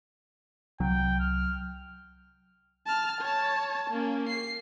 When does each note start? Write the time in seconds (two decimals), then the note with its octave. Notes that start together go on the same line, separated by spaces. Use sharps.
0.80 C2 F#3 G5
1.20 F6
2.87 A5 F6
3.21 C#5 A5
3.90 A#3 C#4
4.29 C7